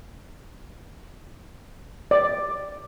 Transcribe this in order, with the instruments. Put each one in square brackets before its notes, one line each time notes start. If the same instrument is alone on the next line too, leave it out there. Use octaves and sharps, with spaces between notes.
[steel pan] D5